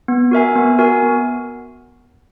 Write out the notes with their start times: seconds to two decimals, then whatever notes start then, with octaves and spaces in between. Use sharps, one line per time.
0.08 B3
0.31 F#4 A#4 E5 G#5
0.55 B3
0.79 F#4 A#4 E5 G#5
1.02 B3